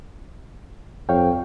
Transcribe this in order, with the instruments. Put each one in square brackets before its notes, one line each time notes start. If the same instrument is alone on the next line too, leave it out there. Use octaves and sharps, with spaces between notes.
[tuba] F2 [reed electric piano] C#5 F5 G5